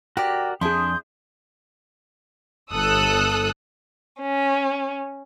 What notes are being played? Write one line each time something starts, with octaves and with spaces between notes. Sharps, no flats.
F#4 G4 A#4 D5
F2 D4 E4 G#4 C6 D#6 G6
G1 A4 D#6 E6 F#6
C#4